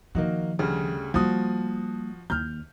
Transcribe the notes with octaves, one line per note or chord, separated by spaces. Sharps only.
D#3 F3 A#3 D#4 F#4
D2 C#3 G3
F3 G3 A#3 F#4 D#6
D#2 D#3 F6 G6